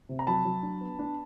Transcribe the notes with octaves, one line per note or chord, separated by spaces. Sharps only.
C3
A#5
F#3 A5 B5
F#3
D4
B3
D4